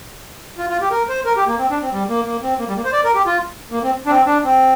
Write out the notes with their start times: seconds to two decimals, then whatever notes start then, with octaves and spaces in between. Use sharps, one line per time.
0.58 F4
0.70 F4
0.81 G4
0.91 A#4
1.09 C5
1.25 A#4
1.37 G4
1.47 A#3
1.59 C4
1.71 D4
1.82 C4
1.92 G3
2.09 A#3
2.25 A#3
2.43 C4
2.59 A#3
2.68 G3
2.76 A#3
2.85 C5
2.93 D5
3.04 A#4
3.15 G4
3.26 F4
3.71 A#3
3.83 C4
4.06 D4
4.10 C4
4.26 D4
4.44 C4